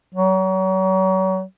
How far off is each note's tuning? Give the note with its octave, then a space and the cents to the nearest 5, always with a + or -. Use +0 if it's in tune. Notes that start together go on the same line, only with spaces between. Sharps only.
F#3 +35